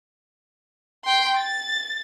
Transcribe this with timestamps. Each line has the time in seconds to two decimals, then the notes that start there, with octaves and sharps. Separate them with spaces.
1.05 G5 C6
1.37 A6